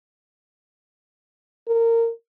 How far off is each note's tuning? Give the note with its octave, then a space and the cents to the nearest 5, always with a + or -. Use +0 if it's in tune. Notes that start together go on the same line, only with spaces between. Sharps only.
A#4 -20